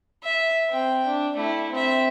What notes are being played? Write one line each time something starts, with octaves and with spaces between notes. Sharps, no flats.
E5
C4 G5
D4
A3 E4
C4 E5